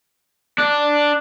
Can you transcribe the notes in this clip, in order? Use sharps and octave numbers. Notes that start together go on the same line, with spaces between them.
D4